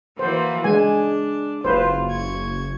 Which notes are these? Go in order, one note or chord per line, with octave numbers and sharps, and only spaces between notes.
E3 A#3 F#4 C5
G#3 D4 G#5
F#1 F4 B4 C5
C#6 G#6